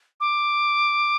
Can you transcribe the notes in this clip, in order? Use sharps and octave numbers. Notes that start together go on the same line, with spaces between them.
D6